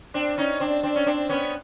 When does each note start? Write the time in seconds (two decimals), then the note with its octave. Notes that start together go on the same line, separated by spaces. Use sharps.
0.14 C4 D4
0.38 C#4 D#4
0.60 C4 D4
0.83 C4 D4
0.96 C#4
1.06 C4 D4
1.29 B3 C#4